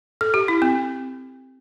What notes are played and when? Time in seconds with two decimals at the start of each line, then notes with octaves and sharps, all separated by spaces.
0.21 A4
0.34 G4
0.48 E4
0.62 C4